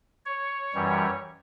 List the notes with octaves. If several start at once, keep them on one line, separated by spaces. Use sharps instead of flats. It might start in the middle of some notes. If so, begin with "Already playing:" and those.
C#5
F#2 E3 G3